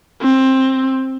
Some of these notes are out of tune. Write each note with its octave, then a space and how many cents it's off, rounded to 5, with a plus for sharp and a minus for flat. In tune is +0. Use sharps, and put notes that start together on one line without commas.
C4 +15